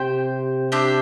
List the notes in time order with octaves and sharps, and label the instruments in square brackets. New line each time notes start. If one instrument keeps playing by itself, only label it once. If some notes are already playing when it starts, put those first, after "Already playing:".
Already playing: [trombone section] C3 [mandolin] G4 C5 G5
[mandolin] D4 G4 C5 E5